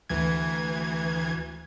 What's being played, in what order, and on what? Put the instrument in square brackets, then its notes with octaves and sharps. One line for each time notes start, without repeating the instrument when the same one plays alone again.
[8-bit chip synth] D2 E3 G#6